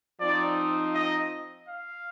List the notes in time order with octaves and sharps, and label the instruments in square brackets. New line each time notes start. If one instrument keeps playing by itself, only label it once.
[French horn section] F3 C4 D#4 [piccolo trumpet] D5
[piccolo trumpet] D#5
F5